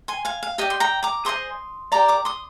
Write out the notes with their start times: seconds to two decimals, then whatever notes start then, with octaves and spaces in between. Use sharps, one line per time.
0.08 G#5 C6
0.25 F5 G#5
0.43 F5
0.58 G4 D5 D#5 G5
0.70 C6
0.80 G5 A#5
1.03 A#5 D6
1.25 G#4 C5 D#5 C6 D#6
1.92 G4 A#4 D5 A#5 D6
2.08 A#5 D6
2.25 C6 D#6